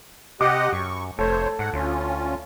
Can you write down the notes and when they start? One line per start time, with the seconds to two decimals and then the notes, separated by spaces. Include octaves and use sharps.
0.41 C3 G4 D#5 F#5 D6
0.73 F#2 C#6
1.19 F1 A3 A4 C5 C#5
1.59 G#2 F#5
1.73 D2 C#4 F4